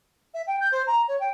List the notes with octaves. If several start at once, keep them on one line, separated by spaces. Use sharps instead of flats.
E5
G5
G6
C5
A#5
C#5
G5